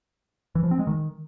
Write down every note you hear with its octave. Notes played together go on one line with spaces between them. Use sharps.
E3
F3
C4
G#3
D#3